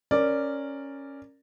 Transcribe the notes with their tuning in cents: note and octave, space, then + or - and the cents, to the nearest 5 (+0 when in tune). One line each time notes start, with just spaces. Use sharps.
C#4 -5 A#4 -10 D5 +0